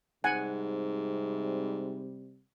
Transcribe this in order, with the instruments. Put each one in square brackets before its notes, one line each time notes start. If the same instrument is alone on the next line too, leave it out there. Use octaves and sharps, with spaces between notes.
[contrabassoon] G#2 [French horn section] C3 G3 [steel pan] F#5 G#5